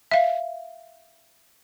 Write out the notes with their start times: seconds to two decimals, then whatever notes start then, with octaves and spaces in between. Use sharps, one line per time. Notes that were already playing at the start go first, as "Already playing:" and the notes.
0.11 E5 F5